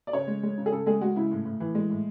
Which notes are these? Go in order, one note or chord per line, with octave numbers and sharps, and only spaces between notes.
D5
C#3 C#5
G#3
G#3
C#3
G#4
C#3 A4
G#3 G#4
G#3 F#4
C#3 E4
A2
A2
E3
G#3
A2